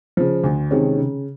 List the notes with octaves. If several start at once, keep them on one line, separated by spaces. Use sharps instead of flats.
C#3 F3
D2
C3 D#3 G#3 C#4
C#3